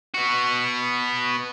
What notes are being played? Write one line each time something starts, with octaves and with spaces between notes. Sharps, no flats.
B3 F#4